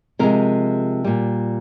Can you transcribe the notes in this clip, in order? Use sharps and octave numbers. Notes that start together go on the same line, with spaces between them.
C3 F3 G#3 A#4
A#2 G3